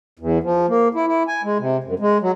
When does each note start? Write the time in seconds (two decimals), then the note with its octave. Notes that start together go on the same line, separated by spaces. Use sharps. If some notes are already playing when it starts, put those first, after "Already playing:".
0.19 E2
0.43 F3
0.68 A#3
0.95 E4
1.07 E4
1.28 G#5
1.43 G#3
1.59 C3
1.84 F#2
1.99 G#3
2.22 F#3